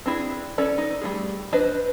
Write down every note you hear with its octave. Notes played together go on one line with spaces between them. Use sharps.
C4 D4 E4 G#4
C#4 A4 D5
D#4
G3 A3 G#4
D4 B4 C5 D#5